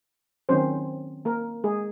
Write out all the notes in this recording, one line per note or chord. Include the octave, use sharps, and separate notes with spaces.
D#3 F#3 C4 C#4 C5
A#3 A#4
G#3 G#4